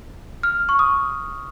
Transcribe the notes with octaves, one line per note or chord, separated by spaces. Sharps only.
F6
C#6
D#6